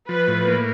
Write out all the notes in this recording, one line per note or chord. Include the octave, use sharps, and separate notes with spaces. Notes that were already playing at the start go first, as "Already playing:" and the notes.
F3 B4
A2
A#3